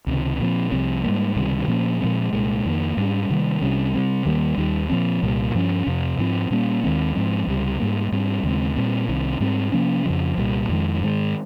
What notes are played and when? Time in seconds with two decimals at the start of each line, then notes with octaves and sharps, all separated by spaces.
0.07 C#2 C3 D#3
0.40 A#2 F3 C4
0.71 C2 C3 F3 C4
1.04 G#2 G3 A#3
1.36 C#2 C3 D#3 G3
1.68 A#2 F3 A#3 C#4
2.01 A#2 F3 G#3 C4
2.33 C2 A#2 G#3
2.65 F2 D#3 A#3
2.97 G#2 G3 C#4
3.30 C3 D#3 G3 A#3
3.61 C2 C3 G3 C#4
3.94 C3 G3 C4
4.26 D#2 D#3 G3 A#3
4.58 D#2 D#3 G3
4.90 A#2 F3 C4
5.22 C2 A#2 G3
5.55 G2 F3 A#3 C#4
5.87 F2 C3 F3
6.19 G#2 F3 C4
6.50 A#2 G3 A#3 C#4
6.84 D#2 D#3 G#3 C4
7.15 G#2 F3 G#3 C4
7.47 C#2 C3 G3
7.80 G#2 G3 A#3
8.12 G#2 G3 C4
8.44 D#2 C#3 G#3 C4
8.76 A#2 G3 C4
9.09 C2 C3 D#3
9.40 G#2 G3 C4
9.72 C3 F3 A#3 C#4
10.05 F2 C#3 F3
10.38 C2 A#2 G3
10.69 F2 D#3 G#3
11.01 G#2 D#3 G#3